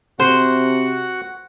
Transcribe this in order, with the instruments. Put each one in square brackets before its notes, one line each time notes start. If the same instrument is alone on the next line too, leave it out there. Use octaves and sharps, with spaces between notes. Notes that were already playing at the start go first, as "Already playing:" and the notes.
[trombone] C3 [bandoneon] F#4 F#5 [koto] C5